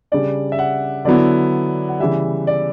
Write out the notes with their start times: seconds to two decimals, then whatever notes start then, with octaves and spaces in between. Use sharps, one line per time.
0.12 C#3 G3 D4 D5
0.52 E5
0.59 F#5
1.05 D3 F#3 B3 E4 D5
1.89 F#5
1.99 C#3 E3 G3 E5
2.47 D5